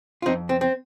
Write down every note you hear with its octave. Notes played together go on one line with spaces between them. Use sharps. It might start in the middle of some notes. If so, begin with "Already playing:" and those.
F4
F2 C4 D#4
C4
C4